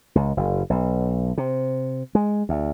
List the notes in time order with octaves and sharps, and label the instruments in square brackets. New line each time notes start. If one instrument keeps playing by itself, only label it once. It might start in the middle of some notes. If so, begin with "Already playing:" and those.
[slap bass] C#2
F#1
B1
C3
G#3
D2